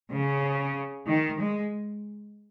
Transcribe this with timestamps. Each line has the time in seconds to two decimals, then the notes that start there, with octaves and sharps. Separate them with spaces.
0.12 C#3
1.08 D#3
1.40 G#3